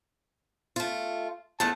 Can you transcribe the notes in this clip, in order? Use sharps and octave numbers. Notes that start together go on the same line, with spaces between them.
A3 F4
E2 A3 F#5 A5